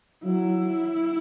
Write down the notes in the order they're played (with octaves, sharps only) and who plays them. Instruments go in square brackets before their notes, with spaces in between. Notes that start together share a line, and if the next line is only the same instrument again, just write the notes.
[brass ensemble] F#3 [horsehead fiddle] E4